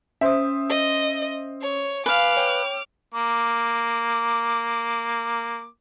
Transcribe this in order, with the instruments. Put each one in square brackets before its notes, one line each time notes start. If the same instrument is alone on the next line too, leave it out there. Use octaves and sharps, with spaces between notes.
[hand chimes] C#4 D#6 [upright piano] C5 E5
[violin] D#5
C#5
[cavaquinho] B4 F5 [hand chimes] G#5 [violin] D6 F6
[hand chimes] C#5 G5
[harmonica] A#3 D6